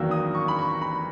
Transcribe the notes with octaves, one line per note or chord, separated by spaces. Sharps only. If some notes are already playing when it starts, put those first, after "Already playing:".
Already playing: E2 D#3 F#3 A#3 E6
D#6
C#6
B5
C#6
B5